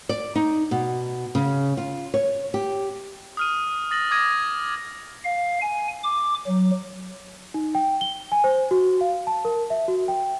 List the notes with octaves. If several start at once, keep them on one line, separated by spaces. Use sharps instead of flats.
D5
D#4
B2
C#3
F4
C#5
G4
D#6 F6 D#7
D#6 A6 A#6 F#7
D6 D#6 G#6 A#6 D#7
F5
G#5
D6
F#3
D#4
G5
G7
G#5
C5
F#4
F5
A5
A#4
E5
F#4
G5